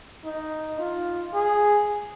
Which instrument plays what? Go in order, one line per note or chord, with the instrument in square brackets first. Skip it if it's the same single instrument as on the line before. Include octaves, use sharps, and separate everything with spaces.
[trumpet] D#4
F4
G#4